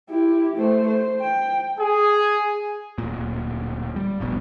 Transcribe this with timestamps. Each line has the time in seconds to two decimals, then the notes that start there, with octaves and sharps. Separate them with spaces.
0.10 E4 G4
0.57 A3 C5
0.88 C5
1.21 G5
1.80 G#4
2.98 D1 A#2
3.96 G3
4.20 F1 A#1 B2